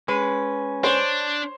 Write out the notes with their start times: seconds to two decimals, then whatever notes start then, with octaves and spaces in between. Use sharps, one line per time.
0.08 G#3 C#4 B4
0.84 D4 C5 C#5